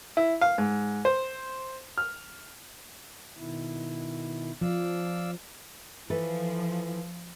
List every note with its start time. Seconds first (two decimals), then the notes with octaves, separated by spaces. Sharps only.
0.17 E4
0.41 F5
0.58 G#2
1.05 C5
1.98 F6
3.36 B2 D#3 E4
4.61 F3 D5 F5 E6
6.10 E3 F3 A4 B4